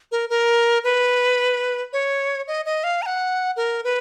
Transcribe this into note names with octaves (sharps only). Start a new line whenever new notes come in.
A#4
A#4
B4
C#5
D#5
D#5
F5
A#5
F#5
A#4
B4